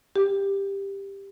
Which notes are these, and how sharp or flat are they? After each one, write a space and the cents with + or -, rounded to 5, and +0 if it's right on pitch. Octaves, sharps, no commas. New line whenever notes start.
G4 +10